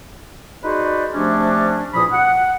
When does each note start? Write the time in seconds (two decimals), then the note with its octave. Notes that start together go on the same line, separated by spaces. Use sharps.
0.63 D#4 F#4 G#4 B4 C5 D5
1.13 C3 F3 A3 C#4 D4
1.94 E2 A#2 F3 B5 D#6
2.12 F#5